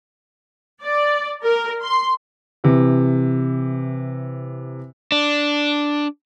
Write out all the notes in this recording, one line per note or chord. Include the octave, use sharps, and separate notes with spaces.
D5
A#4
C6
C3 E3
D4